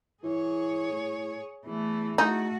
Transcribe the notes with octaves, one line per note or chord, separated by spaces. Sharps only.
E3 G#4 C#5
A2
E2 E3 A3
A3 D#4 F#4